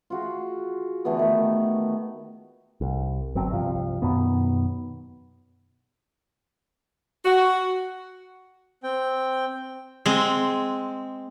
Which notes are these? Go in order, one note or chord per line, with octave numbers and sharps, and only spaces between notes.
F4 F#4 G#4
D3 E3 A3 B3
D#3 A3
C2
G1 F#3 C4
C2 G2 F3
F#2 B2 D#3 B3
F#4
C4 G5
G#3 C4